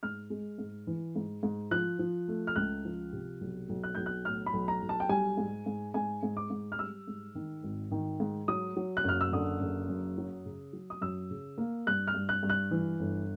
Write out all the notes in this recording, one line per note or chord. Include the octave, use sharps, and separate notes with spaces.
G#2 F6
G#3
G#2
E3
G#2
G#2
F3 F#6
F3
A3
F6
C#2 F#6
F3
C3
B1
B1
F#6
B1 G6
F#6
A2 F6
B5
B1
A#5
B1
A5
G5
G3 G#5
G#2
G#2
G#2 G#5
G#2
D6
G#2
F6
G3 E6
G#2
D#3
G#1
D#3
G#2
F#3 D#6
F#3
F#6
F#1 F6
E6
D3 D#6
F#1
F#2
F#3
C#3
F#3
D#6
F#2 E6
C#3
A#3
G2 F#6
F6
G2
F#6
G2
F#6
E3
G1